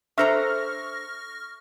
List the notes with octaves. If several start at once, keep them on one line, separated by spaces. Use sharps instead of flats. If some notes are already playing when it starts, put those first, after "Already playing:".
D4 A4 C5 E5 A#5 C#6 F6 A#6